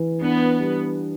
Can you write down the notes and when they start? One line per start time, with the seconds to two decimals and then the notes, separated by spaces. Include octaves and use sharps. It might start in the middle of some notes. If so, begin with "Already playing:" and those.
Already playing: E3
0.21 B3 D4
0.59 G3